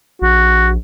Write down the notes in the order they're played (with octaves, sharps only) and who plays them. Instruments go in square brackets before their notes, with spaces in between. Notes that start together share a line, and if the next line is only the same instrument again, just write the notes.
[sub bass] A#1 [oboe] F#4